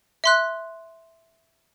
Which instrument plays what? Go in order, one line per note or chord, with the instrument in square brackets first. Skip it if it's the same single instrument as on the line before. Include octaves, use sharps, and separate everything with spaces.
[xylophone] E5 C6 F#6